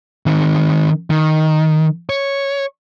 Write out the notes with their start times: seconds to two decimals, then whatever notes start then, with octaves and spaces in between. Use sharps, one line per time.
0.26 D#3 C4
1.10 D#3
2.10 C#5